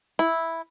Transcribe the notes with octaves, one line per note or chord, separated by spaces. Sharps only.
E4